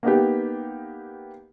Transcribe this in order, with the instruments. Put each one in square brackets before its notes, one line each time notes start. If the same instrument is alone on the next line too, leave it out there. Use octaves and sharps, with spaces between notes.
[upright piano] A#3 B3 D#4 G4